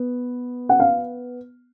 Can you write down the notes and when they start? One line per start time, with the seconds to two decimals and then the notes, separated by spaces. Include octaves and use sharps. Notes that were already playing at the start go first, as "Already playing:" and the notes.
Already playing: B3
0.69 F#5
0.80 F5